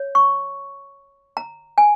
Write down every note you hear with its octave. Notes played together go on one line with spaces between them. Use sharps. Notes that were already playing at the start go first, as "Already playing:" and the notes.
Already playing: C#5
C#6
A#5
G#5